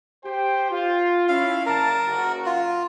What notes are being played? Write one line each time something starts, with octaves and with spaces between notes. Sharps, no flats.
G4 C5 G5
F4
C#4 E4 F5
F#1 A#4 D5 A5
F#1 F#2 F#4
F4